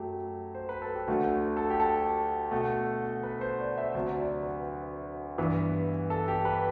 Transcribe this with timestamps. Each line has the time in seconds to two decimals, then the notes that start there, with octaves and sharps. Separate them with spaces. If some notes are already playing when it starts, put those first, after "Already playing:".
Already playing: F#2 F#3 A3 G4
0.55 C5
0.69 B4
0.82 A4
0.95 G4
1.08 D2 D3 A3 F#4
1.57 A4
1.70 G4
1.80 A4
2.51 B2 A3
3.23 B4
3.41 C5
3.59 D5
3.77 E5
3.95 D2 C3 F#3 E5
4.19 D5
4.43 B4
5.38 G2 E3 B3
6.10 A4
6.28 G4
6.45 B4